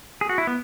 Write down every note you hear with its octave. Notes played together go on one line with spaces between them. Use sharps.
G#4
F#4
E4
B3